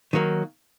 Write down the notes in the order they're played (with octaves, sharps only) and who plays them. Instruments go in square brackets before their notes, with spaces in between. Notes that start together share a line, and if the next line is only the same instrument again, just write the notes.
[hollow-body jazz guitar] D#3 F#3 A#3